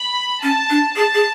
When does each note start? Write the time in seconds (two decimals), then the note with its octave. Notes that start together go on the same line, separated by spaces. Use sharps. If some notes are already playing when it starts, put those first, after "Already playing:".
Already playing: B5
0.43 C#4 A5
0.70 D4
0.95 G#4 A5
1.14 G#4